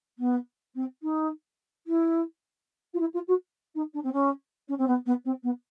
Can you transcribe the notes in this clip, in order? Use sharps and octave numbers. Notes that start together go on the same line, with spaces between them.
B3
C4
D#4
E4
F4
E4
F4
F#4
D#4
D4
C4
C#4
C#4
C4
B3
B3
C4
B3